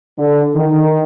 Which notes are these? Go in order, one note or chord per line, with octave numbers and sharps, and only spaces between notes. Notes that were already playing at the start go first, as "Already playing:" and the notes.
D3
D#3